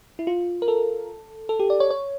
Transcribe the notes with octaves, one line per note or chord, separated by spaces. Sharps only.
E4
F4
A#4
A4
A4
G4
D5
C#5
C#5